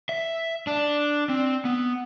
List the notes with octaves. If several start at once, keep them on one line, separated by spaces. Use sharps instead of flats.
E5
D4
C4
B3